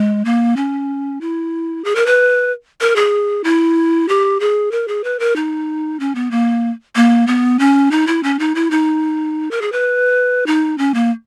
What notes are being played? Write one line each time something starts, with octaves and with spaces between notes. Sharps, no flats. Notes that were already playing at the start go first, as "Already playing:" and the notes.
Already playing: G#3
A#3
C#4
E4
G#4
A#4
B4
A#4
G#4
E4
G4
G#4
A#4
G#4
B4
A#4
D#4
C#4
B3
A#3
A#3
B3
C#4
D#4
E4
C#4
D#4
E4
D#4
A#4
G#4
B4
D#4
C#4
A#3